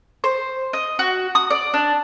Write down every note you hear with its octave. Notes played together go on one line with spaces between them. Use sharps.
C5
D#5
F#4
D#6
D5
D4